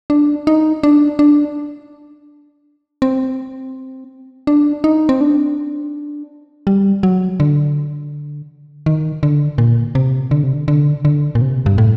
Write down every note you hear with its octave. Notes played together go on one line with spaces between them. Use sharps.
D4
D#4
D4
D4
C4
D4
D#4
C4
D4
G3
F#3
D3
D#3
D3
A#2
C3
D3
C3
D3
D3
D3
A#2
C3
G2
A2